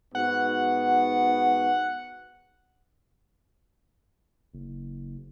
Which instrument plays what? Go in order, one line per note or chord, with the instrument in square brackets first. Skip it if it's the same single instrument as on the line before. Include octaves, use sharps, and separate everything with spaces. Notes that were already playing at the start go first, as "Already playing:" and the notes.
[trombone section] G#2 B3 F#4 [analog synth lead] F#5
[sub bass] F#1